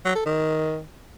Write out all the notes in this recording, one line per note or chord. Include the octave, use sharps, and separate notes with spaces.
F#3
A4
D#3